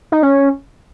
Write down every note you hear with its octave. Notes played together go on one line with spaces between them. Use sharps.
D#4
C#4